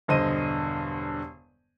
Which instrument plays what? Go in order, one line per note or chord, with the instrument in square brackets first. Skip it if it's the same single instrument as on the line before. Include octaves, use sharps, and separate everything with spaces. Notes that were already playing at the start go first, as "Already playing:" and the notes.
[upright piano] E1 G2 D3 C5 D#5 D#7